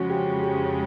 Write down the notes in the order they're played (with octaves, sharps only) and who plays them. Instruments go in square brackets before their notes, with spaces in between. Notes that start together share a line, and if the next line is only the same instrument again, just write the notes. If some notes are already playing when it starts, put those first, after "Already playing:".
Already playing: [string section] F2 C#3 F3 G#3 [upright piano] F#4
[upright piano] G4
G4